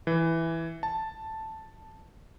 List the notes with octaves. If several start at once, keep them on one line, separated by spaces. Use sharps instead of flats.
E3
A5